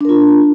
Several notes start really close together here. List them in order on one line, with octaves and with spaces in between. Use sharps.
D4 A#4 F4